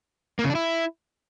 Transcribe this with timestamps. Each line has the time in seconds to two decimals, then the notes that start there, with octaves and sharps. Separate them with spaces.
0.39 A#3
0.44 C#3
0.50 D4
0.55 E4